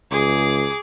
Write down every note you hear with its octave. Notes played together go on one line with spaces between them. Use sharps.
C#2 G#4 D6